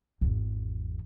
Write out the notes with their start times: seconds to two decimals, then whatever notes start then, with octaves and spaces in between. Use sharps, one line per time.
0.21 G#1 E2